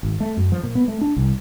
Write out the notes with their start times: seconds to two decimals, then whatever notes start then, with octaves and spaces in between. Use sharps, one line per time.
0.03 G#1
0.20 A3
0.37 F#2
0.52 F3
0.63 A#2
0.75 B3
0.88 A3
1.01 D4
1.17 C2